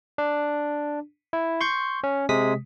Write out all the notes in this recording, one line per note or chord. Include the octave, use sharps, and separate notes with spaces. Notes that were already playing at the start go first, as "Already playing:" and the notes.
D4
E4
C6 C#6 G6
C#4
C3 G#3 D#6 B6